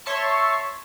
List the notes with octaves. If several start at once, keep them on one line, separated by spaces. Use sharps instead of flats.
C#5 E5 A5 C6 C#6